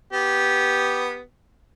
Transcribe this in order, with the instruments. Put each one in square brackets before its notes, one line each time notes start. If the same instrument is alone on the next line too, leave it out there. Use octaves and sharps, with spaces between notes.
[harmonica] B3 G4